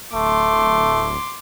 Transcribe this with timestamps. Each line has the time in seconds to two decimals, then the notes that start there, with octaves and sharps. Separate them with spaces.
0.14 D1 A3 C6 D6